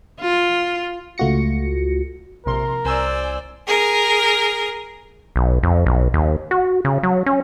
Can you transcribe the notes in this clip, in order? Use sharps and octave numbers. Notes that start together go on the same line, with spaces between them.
F4
C#2 A3 F4 F#4 A#6 C#7
A#1 C3 A#4 C6
C2 C5 D5 G#5 E6
G#4 A#4
B1
F2
B1
D#2
F#4
C#3
F#3
C#4